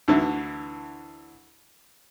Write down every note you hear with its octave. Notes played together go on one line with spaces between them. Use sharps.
D2 D3 E3